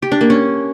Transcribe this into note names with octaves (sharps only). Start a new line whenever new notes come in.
G4
D4
A#3
C#4